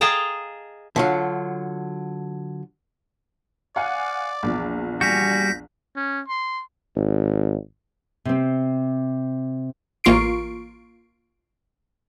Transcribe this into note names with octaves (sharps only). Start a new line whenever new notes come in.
G#4 D#5 F5 G5 A5 A#5
D3 F#3 F4
D5 F5 F#5 G#5
A#1 E2 F3
G3 F#4 G#5 G6 A#6 B6
C#4
C6
G#1
C3 C4
A1 A#3 F4 C#6 C7 D7